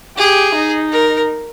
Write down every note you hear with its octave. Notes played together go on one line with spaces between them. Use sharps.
G4 G#4
D#4
A#4